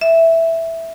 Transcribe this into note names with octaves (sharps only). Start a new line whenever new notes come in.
E5